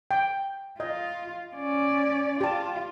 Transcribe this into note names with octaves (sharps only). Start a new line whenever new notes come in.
G5
F4 D#5
C#4 D5
F4 G4 A5